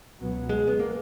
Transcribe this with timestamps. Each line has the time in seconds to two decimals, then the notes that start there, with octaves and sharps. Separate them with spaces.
0.19 C#2 B2 F#3 B3
0.49 G#3
0.68 B3
0.80 A#3